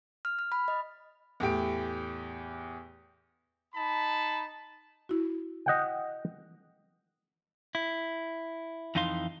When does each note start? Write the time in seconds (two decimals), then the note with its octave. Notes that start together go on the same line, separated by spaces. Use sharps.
0.25 F6
0.39 F6
0.52 B5
0.68 D#5
1.40 E2 A2 G4 D7
3.74 D#4 A5 B5
5.09 E4 F#4
5.66 D#5 F#5 G5
7.75 E4
8.95 F2 E3 D#4 F5 C6